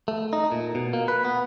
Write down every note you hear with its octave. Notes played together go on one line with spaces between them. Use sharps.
A3
D#4
A#2
B2
A#3
B4
B3